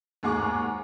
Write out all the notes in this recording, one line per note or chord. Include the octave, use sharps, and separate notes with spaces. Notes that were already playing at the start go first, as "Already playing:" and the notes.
D#2 G#2 G#4 F#5 C#6 D6